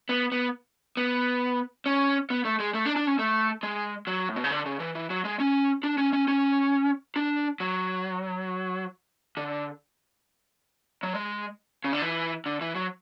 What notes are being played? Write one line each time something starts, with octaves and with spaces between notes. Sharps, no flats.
B3
B3
B3
C#4
B3
A3
G#3
A3
D4
D4
C#4
A3
G#3
F#3
A2
B2
C#3
D3
C#3
E3
E3
F#3
G#3
C#4
D4
C#4
C#4
C#4
D4
F#3
D3
F#3
G#3
C#3
D3
E3
D3
E3
F#3